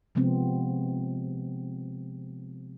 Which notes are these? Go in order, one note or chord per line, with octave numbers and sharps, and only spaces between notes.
C3 F3 G#3 B3 C4